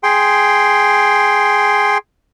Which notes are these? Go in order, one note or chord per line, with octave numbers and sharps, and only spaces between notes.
G#4 G5 C6